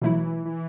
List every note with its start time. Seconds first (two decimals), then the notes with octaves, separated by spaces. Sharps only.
0.02 B2 E3 F#3 A3 E4
0.45 E3